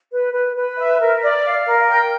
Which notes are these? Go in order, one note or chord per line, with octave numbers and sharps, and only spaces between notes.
B4
B4
B4
E5
A#4
D5
F5
A#4
G5